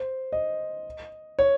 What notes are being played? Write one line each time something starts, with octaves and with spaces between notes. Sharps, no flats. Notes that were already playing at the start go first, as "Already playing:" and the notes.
Already playing: C5
D#5
C#5